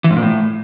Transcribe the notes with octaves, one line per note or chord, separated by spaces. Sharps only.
E3
G#2
A#2
A2